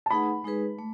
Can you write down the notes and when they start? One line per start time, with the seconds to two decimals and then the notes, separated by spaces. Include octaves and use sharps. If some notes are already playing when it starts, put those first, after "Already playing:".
0.06 A5
0.10 A3 D#4 G#4 B4 F#5 B5
0.44 G#3 D#4 G#4 B4
0.79 A3